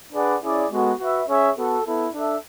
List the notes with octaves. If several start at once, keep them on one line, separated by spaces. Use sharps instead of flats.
D4 G#4 B4 D5 F#5
C#4 E4 G#4 D5
G#3 B3 F#4 A4
F#4 B4 E5
C#4 G#4 C#5 E5
B3 F#4 A4
B3 E4 A4
D4 A4 E5